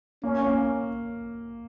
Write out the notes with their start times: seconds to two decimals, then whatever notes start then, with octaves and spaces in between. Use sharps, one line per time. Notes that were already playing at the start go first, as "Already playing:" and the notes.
0.23 A#3 C#4
0.46 A#3